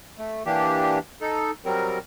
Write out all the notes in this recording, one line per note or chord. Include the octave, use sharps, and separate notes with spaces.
A3
E3 A#3 D4 G4
D#4 A4
F#3 G3 C4 A#4